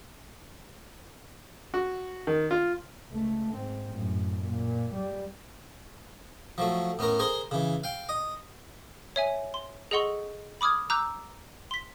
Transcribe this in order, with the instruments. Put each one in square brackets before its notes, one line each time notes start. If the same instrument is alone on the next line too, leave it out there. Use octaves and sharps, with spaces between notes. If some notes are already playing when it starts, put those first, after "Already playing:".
[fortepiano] F#4
D#3
F4
[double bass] C#2 A3
G#2 C4
F#2 A2
A#2
G3
[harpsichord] F3 F#3 A3
A2 B3 C#4 A#4
G#4 A#4 C5 C6
C#3 E3
F5 G5
D#5
[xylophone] C#5 E5 G#5
C6
G#4 A4 D#5 F#5 C6 C#6
B5 D6 D#6 F6 G#6
A#5 D6 E6 F#6 G6
C6 B6